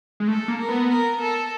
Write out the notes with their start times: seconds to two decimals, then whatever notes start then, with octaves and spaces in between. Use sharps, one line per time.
0.20 G#3
0.27 A3 A4
0.48 A#3
0.59 A#4
0.69 B3
0.90 A#4
1.21 A4